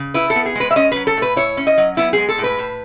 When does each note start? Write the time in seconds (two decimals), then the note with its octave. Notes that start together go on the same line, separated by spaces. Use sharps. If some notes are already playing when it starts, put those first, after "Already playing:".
Already playing: C#3
0.14 E4 B4
0.30 A4
0.36 B3
0.46 G#4
0.55 G#3 B4
0.71 E5
0.76 C#4 D#5
0.92 F#3 B4
1.07 A4
1.17 A2
1.22 B4
1.36 E4 C#5
1.57 C#4
1.67 D#5
1.77 F#3
1.97 B3 E4
2.13 G#3 G#4
2.29 A4
2.38 A2
2.44 B4
2.58 A2